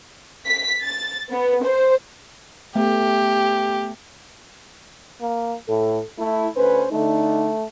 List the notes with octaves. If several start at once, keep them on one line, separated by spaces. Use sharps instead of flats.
B6
A6
B3
C5
A3 B3 G4
A#3
A2 A4
A3 E4
D2 C#4 B4 C5
D3 A3 D#4